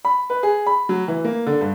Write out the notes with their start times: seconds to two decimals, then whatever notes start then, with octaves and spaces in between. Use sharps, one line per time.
0.05 B5
0.30 B4
0.43 G#4
0.67 B5
0.89 F#3
1.08 E3
1.25 A#3
1.47 D3
1.61 G2